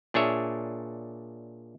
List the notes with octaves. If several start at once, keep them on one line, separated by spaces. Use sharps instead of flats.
A#2 D4 G#4 C#5 E5